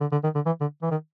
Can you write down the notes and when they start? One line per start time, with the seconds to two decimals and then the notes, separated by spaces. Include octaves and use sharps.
0.01 D3
0.12 D3
0.24 D#3
0.35 D3
0.46 E3
0.61 D3
0.82 E3
0.91 D#3